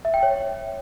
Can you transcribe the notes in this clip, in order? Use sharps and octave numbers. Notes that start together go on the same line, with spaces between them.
E5
G5
C#5